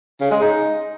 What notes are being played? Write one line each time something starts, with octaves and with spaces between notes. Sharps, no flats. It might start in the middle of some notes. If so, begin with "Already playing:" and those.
C#3
G#3
D#4